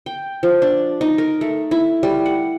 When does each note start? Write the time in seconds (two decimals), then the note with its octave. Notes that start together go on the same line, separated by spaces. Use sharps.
0.06 G5
0.43 F3
0.62 D4
1.01 D#4
1.18 A#4
1.41 A3
1.71 E4
2.03 G3
2.26 F#5